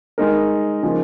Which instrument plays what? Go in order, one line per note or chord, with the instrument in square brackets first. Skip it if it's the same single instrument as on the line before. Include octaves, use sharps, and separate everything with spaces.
[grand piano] G#3 D#4 A#4
C#3 F3 A#3 D#4 G#4